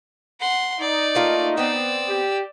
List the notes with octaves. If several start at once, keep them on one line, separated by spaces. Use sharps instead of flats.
F#5 C6
D#4 D5
A3 A#3 F4
B3 C4 D5 E6
G4